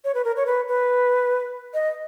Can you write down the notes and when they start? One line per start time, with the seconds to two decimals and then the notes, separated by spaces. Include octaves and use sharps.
0.04 C#5
0.14 B4
0.25 A#4
0.36 C#5
0.46 B4
0.68 B4
1.74 D#5